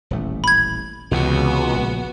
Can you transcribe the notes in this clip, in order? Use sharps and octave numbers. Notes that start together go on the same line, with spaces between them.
D#1 A1 A3
B5 G#6
C#2 C3 E3 B3 C4 F#4
A#1